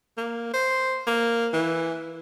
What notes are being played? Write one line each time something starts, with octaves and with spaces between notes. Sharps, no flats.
A#3
C5
A#3
E3